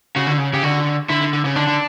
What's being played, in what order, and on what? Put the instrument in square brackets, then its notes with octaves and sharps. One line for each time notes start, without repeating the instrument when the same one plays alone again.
[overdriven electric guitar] C#3 [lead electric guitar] F#4
[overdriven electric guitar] D3
C#3
[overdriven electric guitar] C#3 [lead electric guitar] G4
[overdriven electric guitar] D3 [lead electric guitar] F#4
[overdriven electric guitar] D3 [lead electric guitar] E4
[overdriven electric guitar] D3
D3
C#3
[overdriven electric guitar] D3 [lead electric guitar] D4
[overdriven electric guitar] D3